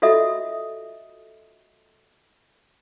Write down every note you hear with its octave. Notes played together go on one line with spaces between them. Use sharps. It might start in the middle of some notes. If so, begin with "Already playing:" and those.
F4 F#4 A4 D#5 E5 D#6